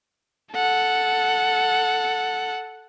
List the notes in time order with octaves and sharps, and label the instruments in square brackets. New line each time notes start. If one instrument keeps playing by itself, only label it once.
[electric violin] A4 F#5